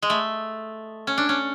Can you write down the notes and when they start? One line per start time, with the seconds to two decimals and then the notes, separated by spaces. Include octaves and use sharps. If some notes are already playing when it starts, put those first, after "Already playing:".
0.02 G#3
0.10 A3
1.07 C#4
1.18 D4
1.29 C#4